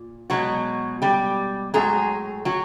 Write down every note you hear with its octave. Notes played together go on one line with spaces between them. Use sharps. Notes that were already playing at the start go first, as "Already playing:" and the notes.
Already playing: A#2
B2 F#3 G#3 F#4
G3 G4
A2 F#3 G#3 G#4
F#3 F#4